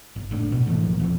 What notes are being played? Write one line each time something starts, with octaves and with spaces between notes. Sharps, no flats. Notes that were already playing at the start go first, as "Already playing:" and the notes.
G1
F#1 A2 D4
B2
G#2 D3 E3 A3
F1 B1 A#2 F3
E2 E3 F3